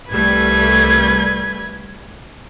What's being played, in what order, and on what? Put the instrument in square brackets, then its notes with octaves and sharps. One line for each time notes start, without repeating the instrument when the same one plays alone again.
[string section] C2 G3 A3 [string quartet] B4 G#6